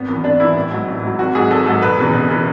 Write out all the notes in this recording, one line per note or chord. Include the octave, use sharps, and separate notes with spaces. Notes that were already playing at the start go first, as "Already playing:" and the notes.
Already playing: G#1 B3
F#2 E3
G#1 D4
F#2 E3 E4
A1
G#2 F#3
A1
G#2 F#3
G#1 F#4
G#2 F#3 G#4
G#1 A4
G#2 F#3 A4
E1 B4
E2 C#3 E3
E1
C#3 E3